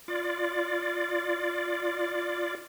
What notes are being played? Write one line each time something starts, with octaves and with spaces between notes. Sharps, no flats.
F4 D5